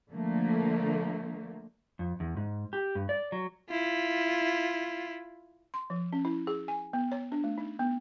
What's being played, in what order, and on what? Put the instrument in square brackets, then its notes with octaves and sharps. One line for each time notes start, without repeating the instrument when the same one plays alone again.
[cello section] D3 F3 A3 A#3
[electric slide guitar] F2
E2
G#2
G4
G2
D5
F#3
[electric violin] E4 F4
[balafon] C6
F3
C#4
E4
G#4
G#5
B3
C#5
D4
A3
D#4
B3